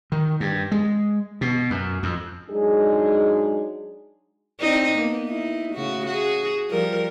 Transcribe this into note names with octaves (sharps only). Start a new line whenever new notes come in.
D#3
G2
G#3
B2
F#2
F2
F#3 G#3 D4 D#4 G#4
C4 D4 D#4
A#3 B3
D#4 E4
C#3 A3 F#4
F#4 G#4
F3 G3 A#4